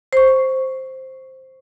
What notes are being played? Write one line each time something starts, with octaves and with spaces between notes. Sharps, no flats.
C5 C#6